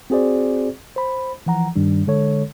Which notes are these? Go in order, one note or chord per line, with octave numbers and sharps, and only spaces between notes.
C4 F#4 G#4 C5 D5
C5 B5
E3 F3 F#5 A#5
G2 D#3 G3 D4
D3 G#3 A4 C#5